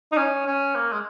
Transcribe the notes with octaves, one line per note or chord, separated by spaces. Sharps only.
D#4
C#4
C#4
A#3
G#3